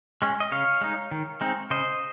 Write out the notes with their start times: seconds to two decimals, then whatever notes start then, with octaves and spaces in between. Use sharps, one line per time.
0.22 G#3 C#4
0.40 D#5
0.52 C#3 C#5 F5
0.81 G#3 D#4
1.11 D#3
1.41 G#3 C4 D#4
1.70 C#3 C5 D#5